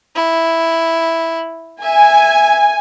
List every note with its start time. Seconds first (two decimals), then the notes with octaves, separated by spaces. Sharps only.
0.16 E4
1.83 E5 G#5